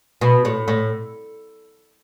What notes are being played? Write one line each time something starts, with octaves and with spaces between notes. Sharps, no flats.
B2
A2
A2